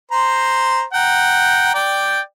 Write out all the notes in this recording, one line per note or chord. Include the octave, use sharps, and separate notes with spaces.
C5 A#5 C6
F#5 G5 A#5
D5 G5